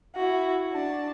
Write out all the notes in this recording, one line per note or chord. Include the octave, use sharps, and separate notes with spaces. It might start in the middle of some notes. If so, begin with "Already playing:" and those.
E4 F#4
D4 A5